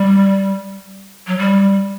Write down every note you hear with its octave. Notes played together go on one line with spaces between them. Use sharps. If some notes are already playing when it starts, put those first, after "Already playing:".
Already playing: G3
F#3
G3